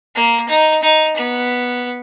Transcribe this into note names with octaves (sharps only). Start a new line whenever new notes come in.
A#3
D#4
D#4
B3